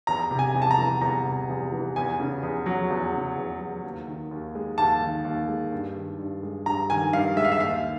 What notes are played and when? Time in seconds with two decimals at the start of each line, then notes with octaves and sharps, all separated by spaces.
0.07 E2 A#5
0.31 C3
0.39 G#5
0.55 E2
0.62 A5
0.71 A#5
0.78 E3
1.01 E2 A#5
1.26 C3
1.49 E2
1.72 E3
1.96 E2 G#5
2.20 C#3
2.43 E2
2.66 F#3
2.90 E2
3.13 C#3
3.36 E2
3.61 F#3
3.83 D#2
4.08 D#3
4.31 D#2
4.55 G#3
4.78 D#2 A5
5.02 D#3
5.25 D#2
5.48 G#3
5.72 G2
5.96 D#3
6.19 G2
6.43 G#3
6.66 G2 A#5
6.90 D#3 G#5
7.13 G2 F5
7.37 G#3 E5
7.45 F5
7.52 E5
7.60 D#2 F5
7.84 D#3